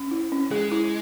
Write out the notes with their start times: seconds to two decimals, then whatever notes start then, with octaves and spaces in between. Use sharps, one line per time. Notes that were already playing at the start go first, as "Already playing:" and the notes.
Already playing: C#4
0.11 E4
0.32 C#4
0.51 G#3 G#4
0.72 E4